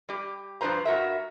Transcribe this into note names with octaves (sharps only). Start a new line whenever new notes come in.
G3 G4
G2 F3 D4 B4 C5 A#5
G2 F#4 A#4 E5